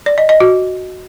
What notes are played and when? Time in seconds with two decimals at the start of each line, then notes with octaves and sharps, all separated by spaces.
0.06 D5
0.18 D#5
0.29 D#5
0.40 F#4